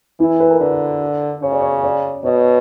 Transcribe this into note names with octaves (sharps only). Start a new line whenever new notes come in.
E3 E4
B4
A#4
D3 B4
C#3 C#5
D5
C#5
D5
B2 C#5